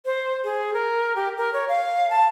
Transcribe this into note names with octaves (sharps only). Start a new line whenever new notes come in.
C5
G#4
A#4
G4
A#4
C#5
F5
A5